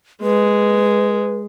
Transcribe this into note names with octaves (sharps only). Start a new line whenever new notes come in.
G#3 B4